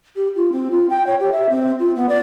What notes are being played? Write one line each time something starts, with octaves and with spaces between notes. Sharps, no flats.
G4
F4
C4
F4
G5
C#5
G4
E5
C4
F4
B3
D5